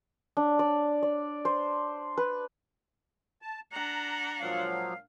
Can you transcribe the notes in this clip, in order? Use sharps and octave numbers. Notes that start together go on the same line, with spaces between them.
D4
D5
D5
C5
B4
A5
D4 F#5 A#5
A#2 F3 F#3 G#3 F5